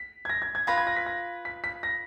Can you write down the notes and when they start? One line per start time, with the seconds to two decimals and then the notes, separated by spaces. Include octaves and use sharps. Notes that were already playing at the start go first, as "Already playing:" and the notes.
Already playing: B6
0.25 G#6
0.29 A#6
0.42 G#6
0.55 G#6
0.67 F4 B4 F5 B5 A#6
0.78 G#6
0.87 A#6
0.96 B6
1.06 A#6
1.45 B6
1.64 B6
1.83 A#6